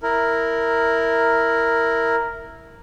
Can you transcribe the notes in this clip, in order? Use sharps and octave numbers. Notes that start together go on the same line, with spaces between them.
E4 A#4